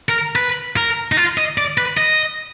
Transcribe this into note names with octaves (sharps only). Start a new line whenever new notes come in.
A#4
B4
A#4
D#4
F4
D#5
D5
B4
D#5